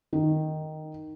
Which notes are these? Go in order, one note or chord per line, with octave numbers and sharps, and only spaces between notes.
D#3